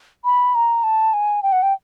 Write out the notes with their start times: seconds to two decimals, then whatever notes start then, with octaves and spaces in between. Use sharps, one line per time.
0.25 B5
0.55 A#5
0.83 A5
1.13 G#5
1.43 G5
1.52 F#5
1.63 G5